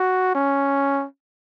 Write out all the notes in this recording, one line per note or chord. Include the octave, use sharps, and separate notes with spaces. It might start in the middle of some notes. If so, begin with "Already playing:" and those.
Already playing: F#4
C#4